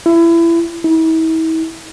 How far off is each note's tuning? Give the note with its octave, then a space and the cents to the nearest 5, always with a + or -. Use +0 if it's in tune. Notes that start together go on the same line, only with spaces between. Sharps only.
E4 +25
E4 -40